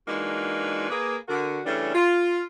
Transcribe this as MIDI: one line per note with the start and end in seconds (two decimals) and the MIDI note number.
0.08 0.88 52
0.08 0.88 56
0.08 0.88 58
0.08 0.88 62
0.08 0.88 63
0.08 0.88 66
0.90 1.16 58
0.90 1.16 68
0.90 1.16 71
1.28 1.61 50
1.28 1.61 66
1.28 1.61 70
1.66 1.93 49
1.66 1.93 52
1.66 1.93 55
1.66 1.93 57
1.66 1.93 61
1.66 1.93 62
1.95 2.42 65